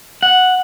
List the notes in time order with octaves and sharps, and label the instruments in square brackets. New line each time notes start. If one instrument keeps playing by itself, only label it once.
[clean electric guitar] F#5